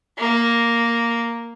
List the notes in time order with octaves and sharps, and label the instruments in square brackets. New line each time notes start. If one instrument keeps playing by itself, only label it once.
[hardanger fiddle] A#3